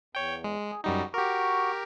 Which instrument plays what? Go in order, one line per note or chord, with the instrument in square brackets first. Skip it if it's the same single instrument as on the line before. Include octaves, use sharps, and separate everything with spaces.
[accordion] E2 [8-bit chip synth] C#5 G5
[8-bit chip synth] G#3
[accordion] G#4
[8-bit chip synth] F#2 G3 D#4 [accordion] G#3 F#4
[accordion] F#4 C#6 D6 [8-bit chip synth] G4 A#4